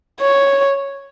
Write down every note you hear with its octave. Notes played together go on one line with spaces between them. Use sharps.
C#5